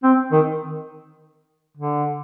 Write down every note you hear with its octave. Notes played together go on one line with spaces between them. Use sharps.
C4
D#3
D3